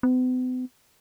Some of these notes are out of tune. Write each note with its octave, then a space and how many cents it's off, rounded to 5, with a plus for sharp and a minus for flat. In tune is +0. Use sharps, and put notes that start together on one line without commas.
B3 +45